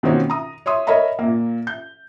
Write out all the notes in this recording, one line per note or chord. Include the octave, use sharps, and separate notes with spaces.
B2 D#3 A#3 C4 C#4 F#4
A#5 D#6
C#5 E5 C6 D#6
A#4 C#5 D#5 E5 A#5 B5
A#2 A#3
G6